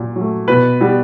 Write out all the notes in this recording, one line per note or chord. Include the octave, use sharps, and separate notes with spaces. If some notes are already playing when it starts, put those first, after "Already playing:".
Already playing: A#2 F#3
F#3
A3
B2 B4
G3 B3